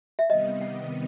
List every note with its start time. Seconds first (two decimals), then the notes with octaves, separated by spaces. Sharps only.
0.19 E5
0.29 C3 D#3 G3 B3 D#4 D#5
0.61 F#5